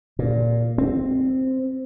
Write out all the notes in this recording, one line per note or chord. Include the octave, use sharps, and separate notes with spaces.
A#2
C4